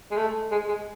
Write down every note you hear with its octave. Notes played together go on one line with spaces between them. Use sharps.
G#3
A3
G#3
G#3